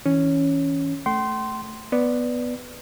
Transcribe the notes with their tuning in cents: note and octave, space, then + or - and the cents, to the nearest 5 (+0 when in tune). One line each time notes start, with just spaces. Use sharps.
E3 -20 C#4 +0
A3 +0 G5 -40 C6 +0
B3 +0 D5 +0